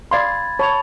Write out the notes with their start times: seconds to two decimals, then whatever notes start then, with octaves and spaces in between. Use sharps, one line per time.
0.11 D5 F5 B5 C6 G#6 A6
0.59 C#5 A5 B5 F7